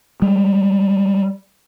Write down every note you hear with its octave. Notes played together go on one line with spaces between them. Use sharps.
G3 G#3